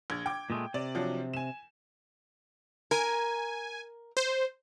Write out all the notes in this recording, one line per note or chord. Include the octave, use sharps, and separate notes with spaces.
A#1 G#6
G5 D6
A#2 G#3 A3
C3 D5
F3 F#3 D4
G#5 E7
A#4 G#5
C5